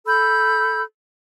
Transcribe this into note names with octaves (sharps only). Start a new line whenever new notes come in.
A4 B5 E6 G6